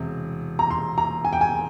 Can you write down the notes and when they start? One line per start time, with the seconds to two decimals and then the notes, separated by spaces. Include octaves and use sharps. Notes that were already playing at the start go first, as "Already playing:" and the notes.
Already playing: E1 C3 C4
0.59 A#5
0.70 C6
0.98 A#5
1.25 G#5
1.33 G5
1.41 G#5